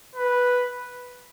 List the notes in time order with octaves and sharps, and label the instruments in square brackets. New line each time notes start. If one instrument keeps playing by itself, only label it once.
[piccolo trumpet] B4